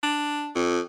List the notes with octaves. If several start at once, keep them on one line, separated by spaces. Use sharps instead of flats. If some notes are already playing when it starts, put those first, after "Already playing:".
D4
F2